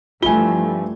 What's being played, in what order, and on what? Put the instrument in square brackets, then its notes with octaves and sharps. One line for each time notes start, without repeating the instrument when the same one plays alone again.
[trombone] G2 [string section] E3 F3 A3 [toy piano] F4 [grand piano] G#5 G7